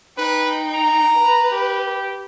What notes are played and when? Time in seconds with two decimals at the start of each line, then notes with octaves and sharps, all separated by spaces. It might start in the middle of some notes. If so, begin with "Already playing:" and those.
0.18 D#4 B4 G5
0.74 A#5
1.17 B4
1.52 G4